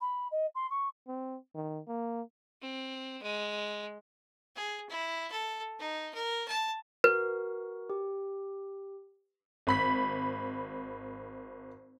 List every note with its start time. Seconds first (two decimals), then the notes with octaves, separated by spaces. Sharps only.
0.01 B5
0.31 D#5
0.55 C6
0.70 C#6
1.08 C4
1.55 D#3
1.88 A#3
2.62 C4
3.23 G#3
4.56 G#4
4.89 E4
5.31 A4
5.79 D#4
6.14 A#4
6.48 A5
7.04 F#4 A#4 B4
7.90 G4
9.67 G#1 B5 B6